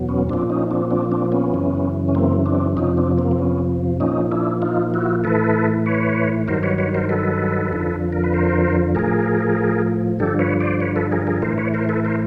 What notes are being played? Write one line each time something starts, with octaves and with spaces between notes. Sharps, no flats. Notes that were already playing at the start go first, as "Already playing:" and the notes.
Already playing: E2 B2 F#3
B3 C#4
A#2 F3 C4 D4
C#4 D#4
C4 D4
C4 D4
C4 D4
B3 C#4
F#2 C#3 E3
C#4
A#3 C4
C4 D4
F2 C3 F3 C#4 D#4
C4 D4
A#3 C4
C4
B3 C#4
A#2 F3 C#4 D#4
D4 E4
D#4 F4
E4 F#4
A2 E3 A4 B4
B4 C#5
G2 D#3 F#3 A#4 C5
B4 C#5
B4 C#5
A#4 C5
A4 B4
F2 D3 F3
A#4
B4
A#4 C5
A2 F3 G#4 A#4
G2 D3 F3 G4 A4
B4 C#5
C5 D5
B4 C#5
A4 B4
G#4 A#4
G#4 A#4
A2 E3 A#4 C5
B4 C#5
A#4 C5
A4 B4
A#4 C5